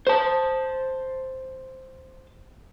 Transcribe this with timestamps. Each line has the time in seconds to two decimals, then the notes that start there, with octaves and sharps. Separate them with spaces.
0.07 C5 A5